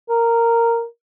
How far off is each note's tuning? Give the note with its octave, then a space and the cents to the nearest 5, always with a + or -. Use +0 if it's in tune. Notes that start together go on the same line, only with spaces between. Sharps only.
A#4 -10